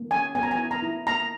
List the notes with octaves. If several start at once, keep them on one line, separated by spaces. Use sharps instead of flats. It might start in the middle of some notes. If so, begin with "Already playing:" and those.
Already playing: A#3
C#4 G#5
B3 G#5
A#5
G#5
E4
A#5
E4
A#3 A#5